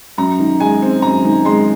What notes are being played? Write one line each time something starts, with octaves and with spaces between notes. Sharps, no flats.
F#2 A#5
D#3
G#3 G#5
C4
F#2 A#5
D#3
G#3 C6